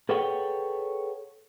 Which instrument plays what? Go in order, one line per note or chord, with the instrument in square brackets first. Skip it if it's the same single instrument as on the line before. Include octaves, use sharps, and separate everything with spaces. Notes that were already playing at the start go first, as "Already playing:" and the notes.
[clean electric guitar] G#4 A4 B4 C#5 F#5 G5